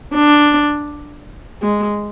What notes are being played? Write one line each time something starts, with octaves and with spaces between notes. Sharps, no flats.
D4
G#3